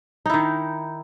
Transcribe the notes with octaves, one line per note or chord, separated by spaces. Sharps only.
D#3 D#4 E4